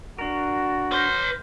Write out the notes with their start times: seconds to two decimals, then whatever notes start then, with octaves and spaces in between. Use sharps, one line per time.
0.18 D4 F#4 A#4 C#6
0.92 B4 C6 F6 G6 A#6